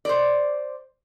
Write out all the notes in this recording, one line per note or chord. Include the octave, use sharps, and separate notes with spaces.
C5 D5